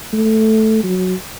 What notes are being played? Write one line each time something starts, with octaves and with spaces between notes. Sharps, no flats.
A3
F#3